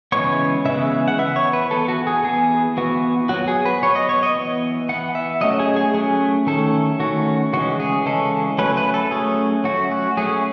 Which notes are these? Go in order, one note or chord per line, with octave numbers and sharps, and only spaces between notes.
C#3 E3 G#3 B3 C#5
C#3 E3 G#3 B3 E5
F#5
E3 B3 E5
C#5
B4
E3 B3 A4
F#4
G#4
E3 B3 G#4
E3 B3 F#4
F#3 B3 F#4
G#4
B4
F#3 B3 C#5
D#5
C#5
D#5
E3 B3
E3 B3 F#5
E5
F#3 A3 C#4 D#5
G#4
G#4
F#3 A3 C#4 G#4
D#3 A3 C#4 A4
D#3 A3 C#4 F#4
C#3 E3 G#3 C#4 F#4
G#4
C#3 E3 G#3 C#4 A4
F#3 A3 C#4 B4
B4
A4
F#3 A3 C#4 G#4
F#3 A3 C#4 F#4
F#4
F#3 A3 C#4 G#4